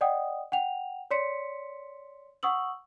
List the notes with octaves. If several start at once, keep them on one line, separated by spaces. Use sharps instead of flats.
D5 D#5 F#5 G5 D#6
F#5 G5 F7
C#5 D5 C6 B6 C#7
F#5 C#6 D#6 E6 F#7